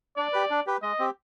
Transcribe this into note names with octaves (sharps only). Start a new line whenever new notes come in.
D4 D5
G4 B4
D4
G4 B4
G#3 D#5
C4 G4